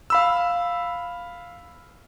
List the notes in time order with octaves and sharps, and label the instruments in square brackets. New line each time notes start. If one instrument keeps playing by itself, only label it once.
[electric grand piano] F5 B5 E6